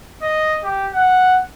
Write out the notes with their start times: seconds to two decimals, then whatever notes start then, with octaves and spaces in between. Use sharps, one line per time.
0.22 D#5
0.64 G4
0.93 F#5